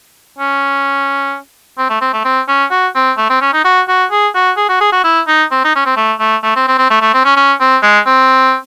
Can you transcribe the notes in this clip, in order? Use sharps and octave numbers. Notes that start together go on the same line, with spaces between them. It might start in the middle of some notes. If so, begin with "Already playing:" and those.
C#4
C4
A3
C4
A3
C4
C#4
F#4
C4
A3
C4
C#4
D#4
F#4
F#4
G#4
F#4
G#4
F#4
G#4
F#4
E4
D#4
C4
D#4
C#4
C4
A3
A3
A3
C4
C4
C4
A3
A3
C4
C#4
C#4
C4
G#3
C4